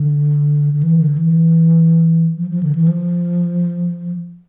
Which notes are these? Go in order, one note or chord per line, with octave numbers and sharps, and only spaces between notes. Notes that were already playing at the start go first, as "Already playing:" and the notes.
Already playing: D3
D3
E3
D3
E3
F3
F3
D3
E3
F3